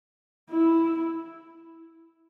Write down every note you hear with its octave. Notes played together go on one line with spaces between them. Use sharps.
E4